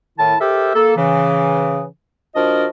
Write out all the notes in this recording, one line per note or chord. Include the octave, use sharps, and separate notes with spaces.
A2 D#3 E4 A5
G4 A4 A#4 C5 E5
A#3 A4
C#3 E3
F3 D4 F#4 A#4 D#5